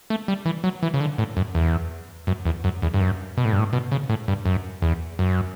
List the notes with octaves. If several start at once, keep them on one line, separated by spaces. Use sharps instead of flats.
A3
G3
E3
F#3
E3
C#3
D3
A2
F#2
E2
F#2
E2
F#2
E2
G2
F#2
B2
A2
G2
A2
B2
C#3
A2
G2
F#2
E2
F#2